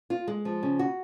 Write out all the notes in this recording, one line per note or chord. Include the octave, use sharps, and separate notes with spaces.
F4
G#3
F3
C#3
F#4